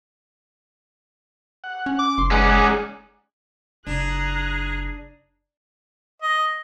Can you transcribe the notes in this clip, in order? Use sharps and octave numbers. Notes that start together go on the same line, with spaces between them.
F#5
C#4
D6
F#1 C6
G#3 B3 C#4 D#4 D5 F#5
G#5
F#1 D4 G#4 A#5 F#6
D#5